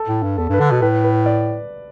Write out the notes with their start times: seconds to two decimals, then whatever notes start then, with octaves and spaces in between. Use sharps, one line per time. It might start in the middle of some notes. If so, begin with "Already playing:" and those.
Already playing: A4
0.08 A2
0.23 G2
0.38 E2 A4
0.49 G2 B4
0.59 D3 A4
0.71 B2
0.82 A2 B4
1.04 B4
1.26 D5